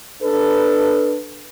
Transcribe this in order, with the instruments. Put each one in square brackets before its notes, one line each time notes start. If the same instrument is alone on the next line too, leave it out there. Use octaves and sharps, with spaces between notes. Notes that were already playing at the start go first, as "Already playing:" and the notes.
[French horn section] D4 A4 B4